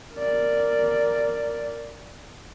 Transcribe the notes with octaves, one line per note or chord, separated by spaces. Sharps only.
A#4 D5